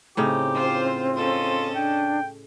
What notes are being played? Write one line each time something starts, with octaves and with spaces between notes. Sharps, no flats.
A2 C#3 C4 D#4 G4
F4 C5
C#4 F4 A4 D#5
D4 G5